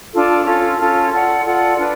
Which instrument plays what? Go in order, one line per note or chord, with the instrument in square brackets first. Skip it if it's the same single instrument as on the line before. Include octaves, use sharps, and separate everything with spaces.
[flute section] D4 F4 A4
C#4 F4 A4
C#4 F4 A4
F4 A4 D5 F#5
F4 A4 D5 F#5
D4 F4 B4 D5